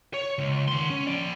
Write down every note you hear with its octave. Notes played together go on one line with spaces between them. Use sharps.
C#5
C#2
D#3 C6
C#4
F3 D5